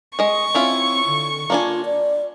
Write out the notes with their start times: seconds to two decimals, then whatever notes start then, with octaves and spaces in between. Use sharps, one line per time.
0.19 G#3 D#5 C#6
0.55 C4 C#4 E4 F4
1.07 D3
1.50 A#3 D4 F4 G#5
1.85 D5